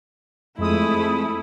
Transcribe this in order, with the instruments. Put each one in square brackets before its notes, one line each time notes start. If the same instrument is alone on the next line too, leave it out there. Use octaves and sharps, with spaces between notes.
[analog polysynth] F2 G#3 D#6 [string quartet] A3 E4